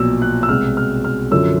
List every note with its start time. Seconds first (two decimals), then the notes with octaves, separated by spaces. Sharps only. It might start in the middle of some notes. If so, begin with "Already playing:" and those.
Already playing: B1 A#2 F3 E6
0.22 F#6
0.43 E6
0.49 C2 B2 G#3 B3 F6
0.77 F6
1.05 F6
1.31 F#2 D3 F3 E6